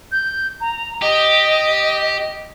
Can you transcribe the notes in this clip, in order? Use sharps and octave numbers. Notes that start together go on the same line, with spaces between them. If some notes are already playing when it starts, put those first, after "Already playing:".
G6
A#5
G4 D#5